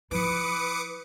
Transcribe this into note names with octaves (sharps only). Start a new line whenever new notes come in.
F3 E4 B4 D6 D#6 C#7